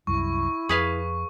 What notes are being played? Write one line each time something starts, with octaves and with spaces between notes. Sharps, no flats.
C2 F#2 G3 E4 C#6
F2 G#4 B4 F5